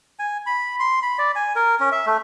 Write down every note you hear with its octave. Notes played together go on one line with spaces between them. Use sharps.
G#5
B5
C6
B5
D5
G#5
A#4
C#4
E5
A3